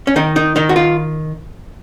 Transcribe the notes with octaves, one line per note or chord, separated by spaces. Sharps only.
C#4
D#3 D#4
D#4
D#3 D#4
F#4
F4